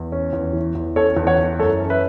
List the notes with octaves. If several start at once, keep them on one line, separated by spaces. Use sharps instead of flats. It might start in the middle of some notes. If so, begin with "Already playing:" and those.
Already playing: E2
C#4
E2
E3
E2
C#4 A4 C#5
E2
C#5 F#5
E3
F#2 A4 C#5
C#4
B4 E5